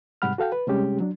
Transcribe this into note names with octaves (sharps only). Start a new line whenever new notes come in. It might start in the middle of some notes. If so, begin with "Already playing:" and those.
G#2 C3 G3 F#5 B5 F6
F#4 A4 F5 G5
B4
C3 G3 G#3 C#4 G4
F#3 D4